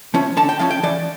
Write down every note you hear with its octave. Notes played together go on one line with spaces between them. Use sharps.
F3 C#4 E4
D3 A5
G5
F3 C#4 E4 F5
G5
E3 D5